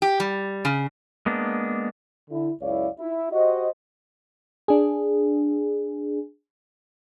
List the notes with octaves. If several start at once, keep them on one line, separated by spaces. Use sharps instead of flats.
G4
G3
C#3
G#3 A#3 B3 D4
D3 E4
C#2 F#2 E4 C#5 D5 F5
E4
F#4 G4 C5 D#5
D4 G#4